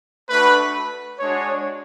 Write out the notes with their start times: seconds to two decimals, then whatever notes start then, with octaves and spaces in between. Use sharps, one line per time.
0.29 A3 D4 F#4 B4
1.20 G#3 D4 F#4 C#5